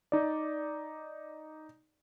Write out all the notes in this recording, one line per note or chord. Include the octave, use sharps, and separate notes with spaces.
D#4 D5